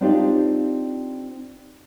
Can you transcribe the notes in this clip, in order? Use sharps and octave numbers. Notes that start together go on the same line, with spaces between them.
C4 D4 D#4 F4 G4 D5